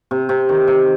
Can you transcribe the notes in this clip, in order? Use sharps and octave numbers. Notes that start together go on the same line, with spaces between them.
C3
C3
D#3
C3